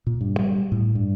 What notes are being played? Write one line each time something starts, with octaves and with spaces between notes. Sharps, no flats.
A#2
G2
G3
A2
G2